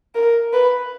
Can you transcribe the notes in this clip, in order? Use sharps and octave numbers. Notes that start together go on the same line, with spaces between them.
A#4
B4